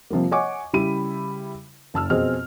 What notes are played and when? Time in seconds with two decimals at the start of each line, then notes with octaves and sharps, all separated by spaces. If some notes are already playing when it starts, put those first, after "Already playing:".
0.10 C3 F3 G3 A#3
0.31 C#5 D#5 F#5 G#5 C#6 D6
0.73 C#3 G3 E4 G4 B5 D#7
1.94 F#1 A5 E6 F6
2.10 F2 B2 C4 G#4 D#5 F6